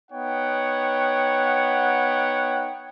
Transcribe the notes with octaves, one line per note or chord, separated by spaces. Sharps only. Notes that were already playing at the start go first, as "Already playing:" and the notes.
B3 D#4 C#5 F#5 G5